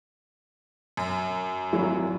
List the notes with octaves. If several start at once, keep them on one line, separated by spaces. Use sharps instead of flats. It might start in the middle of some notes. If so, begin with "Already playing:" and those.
F#2
G#1 F#3 E4